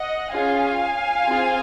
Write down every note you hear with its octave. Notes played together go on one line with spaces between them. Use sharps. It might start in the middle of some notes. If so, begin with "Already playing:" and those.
Already playing: D#5 F#5
C#4 F4 G#4 F5 G#5
C4 F4 G#4